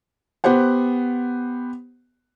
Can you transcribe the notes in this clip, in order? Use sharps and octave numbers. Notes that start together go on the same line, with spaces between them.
B3 G4 C5 F#5